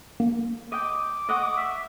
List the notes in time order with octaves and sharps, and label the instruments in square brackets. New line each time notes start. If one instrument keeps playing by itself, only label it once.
[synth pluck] A#3
[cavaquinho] D#5 G5 [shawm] D6
[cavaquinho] D#5 F#5 C#6
[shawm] E5